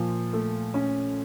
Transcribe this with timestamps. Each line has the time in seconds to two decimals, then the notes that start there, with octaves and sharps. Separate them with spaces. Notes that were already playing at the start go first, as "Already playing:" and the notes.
Already playing: A#2 F3
0.33 A3
0.74 C#4